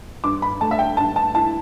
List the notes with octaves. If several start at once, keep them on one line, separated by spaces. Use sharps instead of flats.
G2 D6
B5
A3 A5
E5
G5
G2 A5
A5
E4 A5